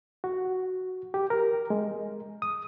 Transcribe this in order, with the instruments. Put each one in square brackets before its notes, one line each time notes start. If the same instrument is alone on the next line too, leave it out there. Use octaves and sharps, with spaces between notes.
[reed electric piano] F#4
G4
A#4
G#3
D#6